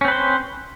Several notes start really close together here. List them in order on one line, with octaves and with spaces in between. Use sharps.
C#4 C4 B4 C5